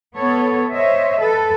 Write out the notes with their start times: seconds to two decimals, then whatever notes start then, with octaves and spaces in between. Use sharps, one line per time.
0.18 B3 A4 C#5
0.73 C5 C#5 D#5 E5
1.20 A4 B4